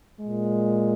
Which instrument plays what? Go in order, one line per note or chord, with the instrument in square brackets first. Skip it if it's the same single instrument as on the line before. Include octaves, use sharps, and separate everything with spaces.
[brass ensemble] A#2 G#3